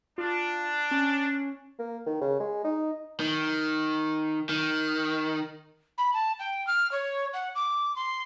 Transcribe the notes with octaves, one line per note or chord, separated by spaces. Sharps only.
D4 F4
C#4
A#3
D#3
C#3
G#3
D#4
D#3
D#3
B5
A5
G5
F6
C#5
F#5
D6
C6